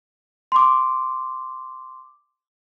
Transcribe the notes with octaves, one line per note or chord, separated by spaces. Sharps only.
C6 D6